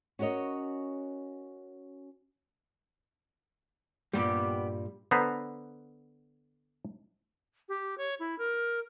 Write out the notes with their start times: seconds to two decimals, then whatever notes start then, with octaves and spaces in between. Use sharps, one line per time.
0.19 C#4 F#4 A#4 C#5 D#5
4.13 G2 A#2 G3 B3 G4
5.11 D3 B3 B4 C5 A#5
7.69 G4
7.98 C#5
8.20 E4
8.39 A#4